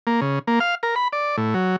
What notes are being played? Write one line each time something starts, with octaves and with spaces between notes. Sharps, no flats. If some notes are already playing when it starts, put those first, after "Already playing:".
A#3
C#3
A#3
F5
A#4
B5
D5
A2
F#3